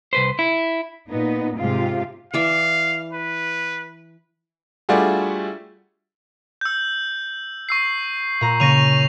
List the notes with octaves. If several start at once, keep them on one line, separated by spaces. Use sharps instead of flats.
C2 B4 C5
E4
A#2 B3 D#4
G#2 C3 G#3 F4 G4 F5
E3 D5 E5 F5
B4
G3 A3 D4 F4 F#4 G#4
E6 G6
C#6 E6 C7
A#2 A#5
C#3 A#3 C#6 A#6 D#7 F7